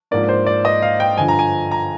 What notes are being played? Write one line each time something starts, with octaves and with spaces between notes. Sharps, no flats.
G#2 F3 A#3 D4 D5
C5
D5
D#5
F5
G5
G2 D3 F3 G#5
A#5
G#5
A#5